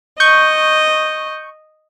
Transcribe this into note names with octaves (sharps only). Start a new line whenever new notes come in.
D#5 C#6 G6